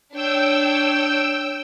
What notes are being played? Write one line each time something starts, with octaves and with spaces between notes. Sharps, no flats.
D4 C#5 G5 E6